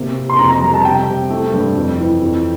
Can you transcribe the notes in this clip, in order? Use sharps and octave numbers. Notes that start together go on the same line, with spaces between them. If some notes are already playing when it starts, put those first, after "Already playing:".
Already playing: C3 A#3
C3
C6
F2 A#5
A#5
G3 A#5
A5
C3 G5
C3
A3
G2
F2
E3
F2